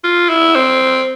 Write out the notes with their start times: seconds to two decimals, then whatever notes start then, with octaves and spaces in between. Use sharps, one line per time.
0.04 F4
0.30 E4
0.55 C4